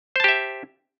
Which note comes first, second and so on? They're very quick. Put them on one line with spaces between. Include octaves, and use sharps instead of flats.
C5 A5 G4 E5